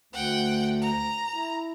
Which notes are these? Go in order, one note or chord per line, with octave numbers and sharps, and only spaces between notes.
D2 F#5 G5
A#5
E4